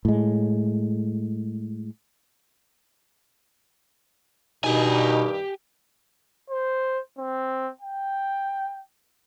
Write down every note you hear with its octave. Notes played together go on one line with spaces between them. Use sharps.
A2 G#3
G2 B2 D#3 G3 D#4 G4 G#5
C5
C4
G5